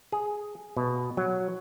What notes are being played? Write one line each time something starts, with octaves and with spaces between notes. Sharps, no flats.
G#4
B2
F#3